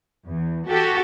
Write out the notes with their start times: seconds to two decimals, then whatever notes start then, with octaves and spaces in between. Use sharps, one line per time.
0.25 E2
0.67 F#4 G4 A4